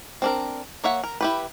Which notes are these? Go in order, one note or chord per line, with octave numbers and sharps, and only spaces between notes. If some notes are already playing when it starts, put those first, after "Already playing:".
C4 D4 A#4
A#3 C#5 E5 F#5
A#4
E4 G4 B4